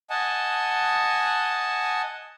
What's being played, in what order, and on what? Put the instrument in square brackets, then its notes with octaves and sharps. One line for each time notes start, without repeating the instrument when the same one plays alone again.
[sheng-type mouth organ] D#5 F#5 G#5 A5